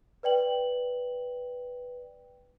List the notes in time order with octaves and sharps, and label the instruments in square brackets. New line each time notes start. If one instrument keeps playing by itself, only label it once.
[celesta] B4 D5 G5 F#7